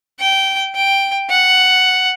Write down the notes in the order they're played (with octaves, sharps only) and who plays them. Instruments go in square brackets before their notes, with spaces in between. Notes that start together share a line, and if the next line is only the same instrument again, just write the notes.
[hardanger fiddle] G5
G5
F#5